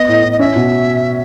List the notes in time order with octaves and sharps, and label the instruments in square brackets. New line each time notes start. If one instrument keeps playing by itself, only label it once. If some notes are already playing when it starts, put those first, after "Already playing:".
Already playing: [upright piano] B3 [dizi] D#5
[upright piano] A2
A2
[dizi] D#5
[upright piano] C#4 [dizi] E5
[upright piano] B2